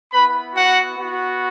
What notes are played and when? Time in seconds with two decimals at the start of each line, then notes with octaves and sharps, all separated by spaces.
0.13 B3 E4 B4 B5
0.55 F#4 F#5
0.97 B3 F#4